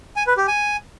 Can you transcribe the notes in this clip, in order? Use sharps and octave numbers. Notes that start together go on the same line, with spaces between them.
G#5
B4
G4
G#5